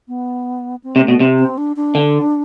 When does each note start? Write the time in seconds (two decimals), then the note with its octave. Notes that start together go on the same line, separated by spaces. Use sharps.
0.08 B3
0.84 C4
0.96 C3
1.02 A3
1.08 B2
1.20 C3
1.39 C4
1.58 D4
1.76 D4
1.95 D3